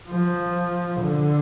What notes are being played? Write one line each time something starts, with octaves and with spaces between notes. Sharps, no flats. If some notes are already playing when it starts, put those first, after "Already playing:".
F3
D3